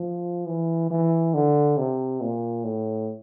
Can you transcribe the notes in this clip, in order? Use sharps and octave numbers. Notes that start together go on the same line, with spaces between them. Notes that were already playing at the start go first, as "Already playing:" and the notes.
Already playing: F3
E3
E3
D3
C3
A#2
A2